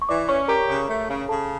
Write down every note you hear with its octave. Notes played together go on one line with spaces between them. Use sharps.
C#6
E3 D5 D6
C#4 C#5 C#6
G4 A#4 A#5
C#3
A3
C#3
C#3 A4 A5